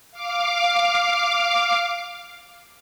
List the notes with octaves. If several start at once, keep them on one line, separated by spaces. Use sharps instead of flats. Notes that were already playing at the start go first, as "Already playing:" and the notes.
F5 D6